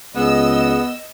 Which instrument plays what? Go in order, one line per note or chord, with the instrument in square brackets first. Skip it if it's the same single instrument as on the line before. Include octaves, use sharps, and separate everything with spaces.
[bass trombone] C#2 [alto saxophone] B3 [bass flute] G#4 [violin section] D#5 E6